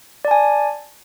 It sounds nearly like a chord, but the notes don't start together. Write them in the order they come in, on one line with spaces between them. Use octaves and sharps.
D5 A5 G#5